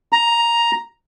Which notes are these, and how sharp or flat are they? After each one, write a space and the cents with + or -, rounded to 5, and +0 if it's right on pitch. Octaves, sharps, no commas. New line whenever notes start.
A#5 +5